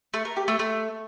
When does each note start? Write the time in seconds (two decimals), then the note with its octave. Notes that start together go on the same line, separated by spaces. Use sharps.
0.14 A3
0.25 A#4
0.36 G4
0.48 A3
0.59 A3